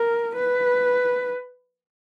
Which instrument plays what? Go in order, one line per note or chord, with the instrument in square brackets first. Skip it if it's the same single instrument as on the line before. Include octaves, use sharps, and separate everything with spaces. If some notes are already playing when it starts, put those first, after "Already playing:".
Already playing: [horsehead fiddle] A#4
B4